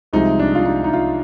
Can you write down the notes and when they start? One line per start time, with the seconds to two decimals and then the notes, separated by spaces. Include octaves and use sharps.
0.13 C2 C3 F3 G#3 D#4
0.39 D4
0.55 F4
0.66 D#4
0.84 D#4
0.93 F4